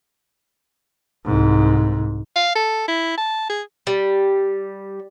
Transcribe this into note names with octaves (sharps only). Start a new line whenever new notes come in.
C2 G#2
F5
A4
E4
A5
G#4
G3